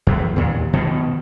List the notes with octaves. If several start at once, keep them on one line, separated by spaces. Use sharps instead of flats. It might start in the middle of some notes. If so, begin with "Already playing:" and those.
E2
D#2 A#2
B2 D#3 F3